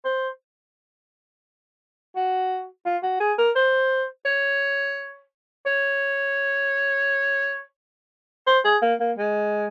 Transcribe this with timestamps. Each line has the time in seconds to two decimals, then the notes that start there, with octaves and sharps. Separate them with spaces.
0.05 C5
2.16 F#4
2.85 F4
3.03 F#4
3.20 G#4
3.38 A#4
3.56 C5
4.25 C#5
5.66 C#5
8.47 C5
8.65 G#4
8.82 A#3
9.00 A#3
9.18 G#3